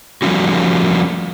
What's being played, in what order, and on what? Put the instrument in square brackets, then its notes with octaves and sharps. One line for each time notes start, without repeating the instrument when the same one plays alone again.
[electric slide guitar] F3 G3 A3 A#3 C#4 F#4